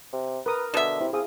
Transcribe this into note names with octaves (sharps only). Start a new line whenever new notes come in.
C3
A#4 B4 D#6
B2 D3 E5
C3 E4
C4 G#4 F5 D#6